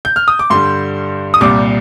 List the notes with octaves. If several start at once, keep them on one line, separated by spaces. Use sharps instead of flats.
G6
F6
D#6
D6
G2 D3 G3 C6
D#6
C2 A#2 G3 D6